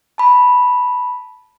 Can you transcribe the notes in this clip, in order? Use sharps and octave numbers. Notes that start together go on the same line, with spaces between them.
A5 B5